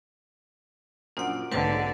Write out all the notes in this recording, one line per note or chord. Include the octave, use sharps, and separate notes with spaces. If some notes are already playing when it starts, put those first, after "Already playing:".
F#2 A#2 F3 D4 F#5 D7
B1 G#2 D3 A3 C4 B4 A5